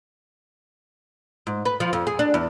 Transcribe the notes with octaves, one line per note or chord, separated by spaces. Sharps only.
G#2
B4
F3
F2
G#4
D4
E2